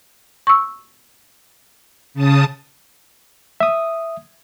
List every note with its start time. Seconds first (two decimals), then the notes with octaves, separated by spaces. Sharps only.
0.47 C#6 E6
2.14 C#3 A5 D#6
3.60 E5 D#6